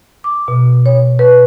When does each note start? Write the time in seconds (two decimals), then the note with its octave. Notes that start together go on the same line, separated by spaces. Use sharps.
0.24 D6
0.48 B2
0.86 C#5
1.19 B4